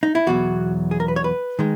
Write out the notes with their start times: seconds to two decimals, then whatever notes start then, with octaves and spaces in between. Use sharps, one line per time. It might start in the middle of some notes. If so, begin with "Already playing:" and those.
0.03 D#4
0.15 E4
0.27 E2 B2 F#3 F#4
0.91 G#4
1.00 A#4
1.08 B4
1.16 C#5
1.24 B4
1.59 D#3 G#3